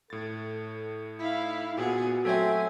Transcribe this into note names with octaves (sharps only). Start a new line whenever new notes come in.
A2 A4 A6
D#4 E4 F5
A#2 B3 F#4 G#4 F#5
F#3 A3 C4 A4 C#5 E5 G#5